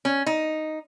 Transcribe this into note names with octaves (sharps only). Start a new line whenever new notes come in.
C#4
D#4